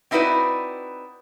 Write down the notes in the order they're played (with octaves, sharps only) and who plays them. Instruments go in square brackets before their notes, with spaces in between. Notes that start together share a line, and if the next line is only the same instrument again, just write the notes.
[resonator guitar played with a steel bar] C4 D#4 E4 F#4 B4 D5